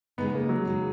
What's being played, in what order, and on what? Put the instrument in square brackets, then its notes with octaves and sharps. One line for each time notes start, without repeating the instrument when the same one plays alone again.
[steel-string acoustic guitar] C#3 G#3 D#4 [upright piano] B3
[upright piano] B3
A#3
F#3
[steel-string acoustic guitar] C#3 G#3 D#4